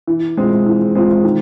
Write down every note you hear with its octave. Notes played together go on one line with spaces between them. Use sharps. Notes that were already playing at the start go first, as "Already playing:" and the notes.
E3
G#3 C4 F4
E3
G#3 C4 F4
D#3